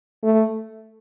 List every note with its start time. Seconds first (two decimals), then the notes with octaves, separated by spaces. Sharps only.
0.23 A3